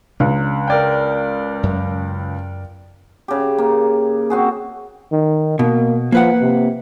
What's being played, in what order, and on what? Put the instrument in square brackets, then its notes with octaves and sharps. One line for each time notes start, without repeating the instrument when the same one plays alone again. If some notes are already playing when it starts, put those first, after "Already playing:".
[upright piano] C#2 [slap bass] D4
[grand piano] A#4 D5 G5
[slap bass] F#2
[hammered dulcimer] C#3 G4
A#3
C4 F#4 G#4
[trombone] D#3
[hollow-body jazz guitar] B2 [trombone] A#3
[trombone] F3 [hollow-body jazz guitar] A#3 B4 F#5
[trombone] C3